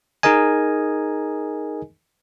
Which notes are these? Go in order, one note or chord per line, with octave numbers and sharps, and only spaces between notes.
D#4 G#4 A#4 D#5 G#5